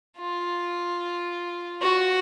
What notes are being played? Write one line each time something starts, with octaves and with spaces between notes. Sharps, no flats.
F4
F#4